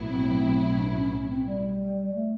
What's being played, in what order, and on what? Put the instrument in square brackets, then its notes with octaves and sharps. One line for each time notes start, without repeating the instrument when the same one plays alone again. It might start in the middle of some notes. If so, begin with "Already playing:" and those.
Already playing: [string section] B1 A2 F#3 B3 E4
[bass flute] C4
D4
C#4
C#4
C4
G3
A3